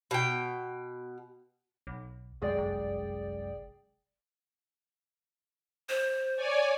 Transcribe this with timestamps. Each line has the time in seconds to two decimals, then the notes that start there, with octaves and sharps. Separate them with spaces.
0.11 B2 G5
1.87 B1
2.42 C2 F#2 G#3 G#4 D5 G5
2.58 G1
5.89 C5
6.36 C#5 D5 G#5